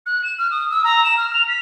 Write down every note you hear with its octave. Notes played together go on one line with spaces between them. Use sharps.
F#6
E7
F6
D#6
E6
A#5
E7
F6
F7
B6